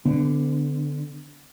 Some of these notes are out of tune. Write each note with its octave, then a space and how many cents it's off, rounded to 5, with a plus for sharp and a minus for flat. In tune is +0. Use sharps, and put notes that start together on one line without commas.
D3 +0 B3 +35